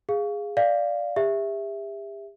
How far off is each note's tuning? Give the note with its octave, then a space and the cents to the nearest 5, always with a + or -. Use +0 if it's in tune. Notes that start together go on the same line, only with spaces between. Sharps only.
G#4 -10 F5 +0
D5 +0 F5 -5
G4 +40 E5 +0